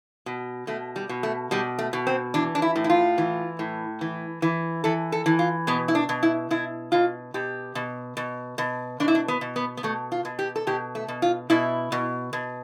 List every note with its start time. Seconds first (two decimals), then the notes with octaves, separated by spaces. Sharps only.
0.26 B2
0.67 B2 A3
0.96 G3
1.09 B2
1.23 A3
1.51 B2 G3
1.79 A3
1.93 B2
2.07 C4
2.34 E3 D4
2.55 D4
2.62 E4
2.76 A2
2.84 E4
2.90 F4
3.18 E3
3.59 A2
4.01 E3
4.42 E3
4.84 E3 A4
5.12 A4
5.26 E3
5.39 F4
5.67 B2 B3
5.88 E4
5.95 D4
6.09 B2
6.23 E4
6.50 B2 E4
6.92 B2 F4
7.34 B2 G4
7.75 B2
8.17 B2
8.58 B2
9.00 B2 D4
9.08 E4
9.15 D4
9.28 B3
9.41 B2
9.56 B3
9.77 B3
9.83 B2 A3
10.12 F4
10.25 B2
10.39 G4
10.56 A4
10.67 B2 G4
10.95 A3
11.08 B2
11.22 F4
11.50 B2 E4
11.92 B2
12.33 B2